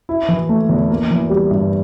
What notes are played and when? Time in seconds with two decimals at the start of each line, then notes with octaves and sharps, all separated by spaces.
0.09 E4
0.28 E3
0.49 A3
0.69 E2
0.90 A#3
1.11 E3
1.30 G3
1.51 G2